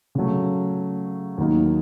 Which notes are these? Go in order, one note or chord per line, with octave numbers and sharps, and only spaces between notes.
C#3 F#3 A3
D#2 D#3 F#3 A#3 D#4